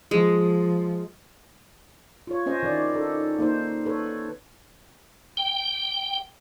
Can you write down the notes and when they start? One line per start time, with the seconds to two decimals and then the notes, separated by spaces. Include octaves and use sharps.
0.11 F3 G#3
2.27 F4 C#5
2.46 C4 C#4 C5 D#5
2.63 D#3 E4 D5
2.94 D#4 A4
3.39 A#3 D#4 C5
3.86 A4 B4 C#5
5.37 G5